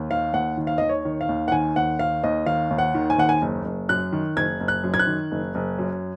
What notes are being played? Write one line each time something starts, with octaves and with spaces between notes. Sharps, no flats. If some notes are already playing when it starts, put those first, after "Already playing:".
Already playing: D#2
D#3 F5
D#2 F#5
D#3
F5
D#2 D#5
C#5
D#3
F5
D#2
F#5
D#3 G#5
D#2 F#5
D#3 F5
D#2 D#5
D#3 F5
D#2
F#5
D#3
G#5
D#2 F#5
G#5
F#1
F#1
F#2 F#6
D#3
F#1 G#6
F#1
F#6
F#2
G#6
F#6
D#3
F#1
F#1
F#2